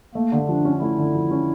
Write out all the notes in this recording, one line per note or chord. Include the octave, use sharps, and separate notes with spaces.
A3 A#3
D3
F3 D4
C#4
A3 E4
D3
F3
C#4